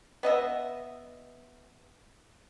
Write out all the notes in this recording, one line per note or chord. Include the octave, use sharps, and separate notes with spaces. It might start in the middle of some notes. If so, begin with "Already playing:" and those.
B3 D#5 E5